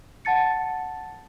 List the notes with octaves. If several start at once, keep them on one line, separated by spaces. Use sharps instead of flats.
F#5 A5 A6 C#7